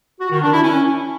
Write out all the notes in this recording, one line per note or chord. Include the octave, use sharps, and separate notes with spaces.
F#4
D#3
D4
E4
C#4